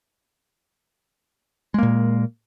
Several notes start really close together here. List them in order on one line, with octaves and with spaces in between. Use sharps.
G#3 A#3 A#2